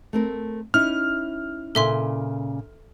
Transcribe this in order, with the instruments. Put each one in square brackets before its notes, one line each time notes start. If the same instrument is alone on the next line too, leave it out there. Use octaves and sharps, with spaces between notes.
[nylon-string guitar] A3 C4 A#4
[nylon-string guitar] C#4 D#4 E4 [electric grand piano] F6
[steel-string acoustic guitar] A#2 C#3 [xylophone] A4 E5 C6